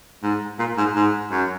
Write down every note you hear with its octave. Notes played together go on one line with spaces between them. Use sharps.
G#2
A#2
G#2
G#2
F#2